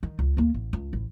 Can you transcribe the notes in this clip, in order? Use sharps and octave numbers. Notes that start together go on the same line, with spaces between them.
D#3
C#2
D2 A#3
A1
C#2
A1